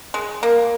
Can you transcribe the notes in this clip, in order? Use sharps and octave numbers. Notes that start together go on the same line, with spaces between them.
G#3
A#3